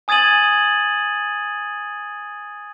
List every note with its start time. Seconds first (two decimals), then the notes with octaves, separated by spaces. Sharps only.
0.08 G#5 D#6 G#6 A6 D#7 F#7